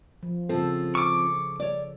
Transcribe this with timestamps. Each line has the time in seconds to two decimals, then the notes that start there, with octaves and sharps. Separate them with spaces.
0.23 F3
0.49 C#3 F3 C4 A4
0.95 C#6 D6
1.60 C#5 D5